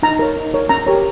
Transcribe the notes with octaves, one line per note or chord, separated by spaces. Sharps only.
D#4 A#5
A#4 C#5
D#4
A#4 C#5
C#4 A#5
G4 A#4 C#5